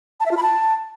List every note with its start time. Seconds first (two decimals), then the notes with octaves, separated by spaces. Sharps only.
0.20 A5
0.26 E5
0.31 F4
0.37 B5
0.43 A5